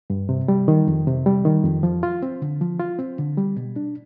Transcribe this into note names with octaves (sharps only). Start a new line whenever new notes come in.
G2
C3
G3
D#3
F2
C3
G3
D#3
F2
F3
F4
C4
D3
F3
F4
C4
D3
G3
B2
D4